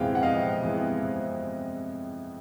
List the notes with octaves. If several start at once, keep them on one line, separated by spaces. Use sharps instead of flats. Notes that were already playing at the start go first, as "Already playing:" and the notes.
Already playing: F2 C3 E3 G#3 B3 F5 G5
F#5
F2 D#5 F5
C3 E3 G#3 B3
F2